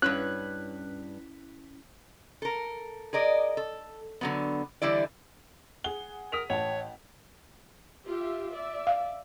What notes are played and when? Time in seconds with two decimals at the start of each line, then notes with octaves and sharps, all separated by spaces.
0.02 G2 C#4 E4 B4 C#5 F#6 B6
2.42 A4 A#4
3.13 G#4 A#4 D5 D#5
3.57 A4
4.21 D3 F#3 B3
4.82 D3 E3 G3 E4 D5
5.84 G#4 F#5 G7
6.32 A#4 D#6 B6 F7
6.50 A1 C#5 F#5 G5 A5 F7
8.06 F4 G4 E5
8.50 D5 E5
8.87 F5